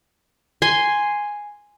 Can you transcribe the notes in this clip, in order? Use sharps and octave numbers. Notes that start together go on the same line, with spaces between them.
G#5 C6